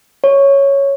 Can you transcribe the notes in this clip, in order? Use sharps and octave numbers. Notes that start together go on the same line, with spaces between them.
C#5